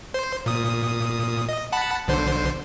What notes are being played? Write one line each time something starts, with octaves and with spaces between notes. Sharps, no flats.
C5
A#2 D#6
D#5
F#5 A5 B5
B1 D3 C5